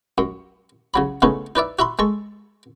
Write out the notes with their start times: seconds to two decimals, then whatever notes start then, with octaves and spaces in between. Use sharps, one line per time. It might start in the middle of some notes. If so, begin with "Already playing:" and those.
0.18 F#2
0.94 C#3 F#3 B5
1.22 C#3 A3 B3 C#4 D#4
1.56 D#4 B4 D5 E5
1.79 F#4 E5 B5 C6
1.99 G#3 A4 C#6